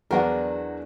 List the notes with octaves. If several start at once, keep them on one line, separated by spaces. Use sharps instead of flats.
E2 F#3 B3 D4 F#4 G#4 A#4